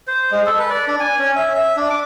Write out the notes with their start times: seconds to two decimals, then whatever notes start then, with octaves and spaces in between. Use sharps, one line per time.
0.07 C5
0.31 G#3
0.46 A4
0.59 B4
0.70 D5
0.88 D4
1.00 G#5
1.19 C#4
1.36 E5
1.54 E5
1.77 D4
1.90 D6